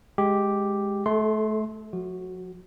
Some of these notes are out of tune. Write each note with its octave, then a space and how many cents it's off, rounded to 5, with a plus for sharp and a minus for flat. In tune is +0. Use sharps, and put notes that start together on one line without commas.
G#3 +0 G4 +0
A3 -30 A4 +0 C6 +0
F3 +45 F#4 +0